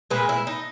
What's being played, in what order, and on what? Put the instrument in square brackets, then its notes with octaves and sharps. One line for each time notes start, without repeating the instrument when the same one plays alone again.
[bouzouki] A#2 G#3 B4
E4
D#4